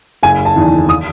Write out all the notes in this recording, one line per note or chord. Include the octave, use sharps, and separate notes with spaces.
F#1 G#5
A5
E2 D#3
D#6